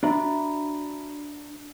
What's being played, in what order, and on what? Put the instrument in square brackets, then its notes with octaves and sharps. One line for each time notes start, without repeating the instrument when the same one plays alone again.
[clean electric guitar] D4 F#4 D5 E5 A#5 B5